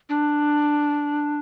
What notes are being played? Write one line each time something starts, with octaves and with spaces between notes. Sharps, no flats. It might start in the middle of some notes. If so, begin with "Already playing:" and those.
D4